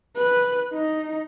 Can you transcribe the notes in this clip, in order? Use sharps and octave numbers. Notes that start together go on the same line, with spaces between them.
B4
D#4